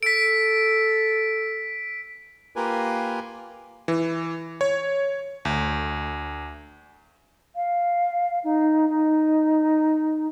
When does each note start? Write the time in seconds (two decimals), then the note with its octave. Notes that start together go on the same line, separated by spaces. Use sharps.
0.03 A4 B6 D7
2.56 A#3 F4 G4 A#4 B4 G#5
3.88 E3
4.61 C#5
5.45 D2
7.56 F5
8.44 D#4
8.89 D#4